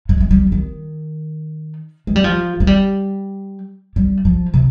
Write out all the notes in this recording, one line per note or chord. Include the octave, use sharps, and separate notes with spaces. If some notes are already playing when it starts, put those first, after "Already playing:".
G#3
G#3
G3
D#3
G#3
G3
F3
G#3
G3
G3
F3
C3